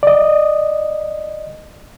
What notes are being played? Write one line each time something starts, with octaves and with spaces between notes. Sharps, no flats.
D5 D#5